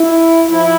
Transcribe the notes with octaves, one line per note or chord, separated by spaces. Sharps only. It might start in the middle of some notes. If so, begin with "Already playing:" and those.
Already playing: E4
F3 E4